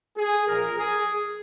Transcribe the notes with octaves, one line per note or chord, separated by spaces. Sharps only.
G#4
A#1 A#2 F3 A#4
G#4